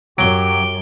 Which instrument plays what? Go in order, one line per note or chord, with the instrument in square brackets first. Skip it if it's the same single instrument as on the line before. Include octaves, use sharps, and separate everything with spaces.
[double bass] F#2 [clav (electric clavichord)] F#3 [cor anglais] G4 [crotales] D7 G7